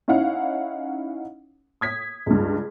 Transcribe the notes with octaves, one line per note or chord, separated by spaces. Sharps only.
C#4 D#4 E4 F5 F#5
D#6 G#6 B6
C#2 G2